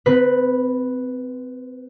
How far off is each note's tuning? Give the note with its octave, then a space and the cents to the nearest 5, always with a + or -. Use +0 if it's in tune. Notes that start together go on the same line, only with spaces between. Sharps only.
C4 -35 B4 +0